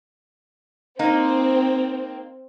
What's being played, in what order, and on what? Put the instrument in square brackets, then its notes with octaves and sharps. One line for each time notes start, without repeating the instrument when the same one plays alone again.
[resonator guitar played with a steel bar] A#3 D#4 [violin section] C4